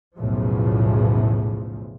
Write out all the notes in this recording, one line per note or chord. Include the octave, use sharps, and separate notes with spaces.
B1 E2 A2 C#3 F3